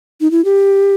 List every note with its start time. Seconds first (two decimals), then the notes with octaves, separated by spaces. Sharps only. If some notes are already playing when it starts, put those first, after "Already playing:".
0.21 D#4
0.31 E4
0.45 G4